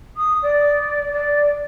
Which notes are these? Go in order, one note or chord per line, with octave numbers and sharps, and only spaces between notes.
D#6
D5
D5